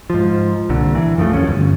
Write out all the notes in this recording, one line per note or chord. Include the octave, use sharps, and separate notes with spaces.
G#2 F3
C2 A#2 D3
E3
F#2 F3 A3
D#2 C#4
G1